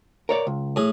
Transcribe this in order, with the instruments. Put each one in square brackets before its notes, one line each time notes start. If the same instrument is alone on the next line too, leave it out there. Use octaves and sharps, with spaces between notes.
[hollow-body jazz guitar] A#4 C#5 D5
C#2
[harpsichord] A2 G#4